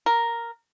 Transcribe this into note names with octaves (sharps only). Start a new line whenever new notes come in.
A#4